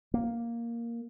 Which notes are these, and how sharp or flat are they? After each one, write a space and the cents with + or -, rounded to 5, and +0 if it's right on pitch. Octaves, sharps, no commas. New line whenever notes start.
A#3 +0